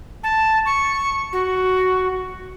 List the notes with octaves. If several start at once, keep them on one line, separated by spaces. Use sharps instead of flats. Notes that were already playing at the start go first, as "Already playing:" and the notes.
A5
C#6
F#4